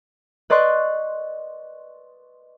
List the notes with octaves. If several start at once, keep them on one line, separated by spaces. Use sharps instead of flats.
B4 D5 D#5 C6 C#6 F#6